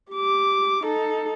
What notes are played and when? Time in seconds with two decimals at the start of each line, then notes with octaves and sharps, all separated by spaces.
0.13 G4 D6
0.84 D#4 A4